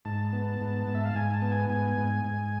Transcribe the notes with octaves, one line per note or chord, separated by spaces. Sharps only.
G#2 A5
B3
G#2
G#2
E5
F5
G#2 G#5
A5
B3
G#5
G#2 G#5
G#2
G#2